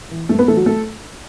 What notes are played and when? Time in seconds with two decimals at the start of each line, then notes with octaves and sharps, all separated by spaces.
0.11 E3
0.29 G2 A3 A4
0.39 B3 B4
0.48 E3 A3 A4
0.57 F#3 F#4
0.66 A3 A4